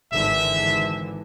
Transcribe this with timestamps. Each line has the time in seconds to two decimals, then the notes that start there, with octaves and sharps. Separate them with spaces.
0.12 G#1 D3 E3 E5